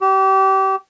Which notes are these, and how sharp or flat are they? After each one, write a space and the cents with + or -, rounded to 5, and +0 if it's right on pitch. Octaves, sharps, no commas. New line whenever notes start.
G4 -30